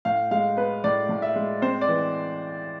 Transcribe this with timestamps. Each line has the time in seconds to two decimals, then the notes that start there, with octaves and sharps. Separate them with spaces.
0.05 A2 F5
0.31 G#3 F5
0.57 B3 B4
0.84 A2 D5
1.09 A2
1.22 E5
1.36 G#3
1.62 C4 C5
1.81 D5
1.88 E3